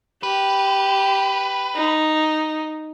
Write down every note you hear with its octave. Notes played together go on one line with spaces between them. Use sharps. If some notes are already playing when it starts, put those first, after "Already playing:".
G4 B4
D#4